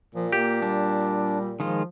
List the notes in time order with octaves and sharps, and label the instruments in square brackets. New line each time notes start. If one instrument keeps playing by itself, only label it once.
[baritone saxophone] A#2 [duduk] F3
[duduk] A#3 [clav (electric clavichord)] G4
[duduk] G3 [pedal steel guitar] D4
[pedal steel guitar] D#3 G#3 F4 [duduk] F3